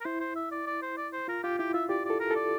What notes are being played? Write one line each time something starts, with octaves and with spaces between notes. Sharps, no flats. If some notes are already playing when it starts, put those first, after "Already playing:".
A#4
E4 C5
C5
E5
D5
D5
C5
D5
C5
F4 A#4
F4 G4
E4 G4
F4 E5
G4 D5
A4 D5
A#4
A4 D5